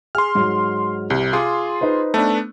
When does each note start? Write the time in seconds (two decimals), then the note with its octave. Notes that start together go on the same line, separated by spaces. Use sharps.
0.15 G#4 C6 F6
0.35 G#2 F#3
1.10 C2 C3
1.33 F4 G#4 C6 D6
1.81 D#4 B4 C5
2.14 A3 B3 D4